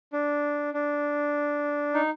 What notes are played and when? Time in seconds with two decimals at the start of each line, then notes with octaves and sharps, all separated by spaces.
0.13 D4
0.74 D4
1.94 D#4